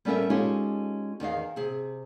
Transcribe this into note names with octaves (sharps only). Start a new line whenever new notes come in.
G3 B3 C#4 A4 A#4 E5
G#3 C#4 D#4 F4 G4 A4
E2 D#3 D#5 F5
C3 G#4